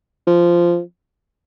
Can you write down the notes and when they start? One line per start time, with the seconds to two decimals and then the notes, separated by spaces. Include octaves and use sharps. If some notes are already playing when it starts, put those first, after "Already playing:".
0.27 F3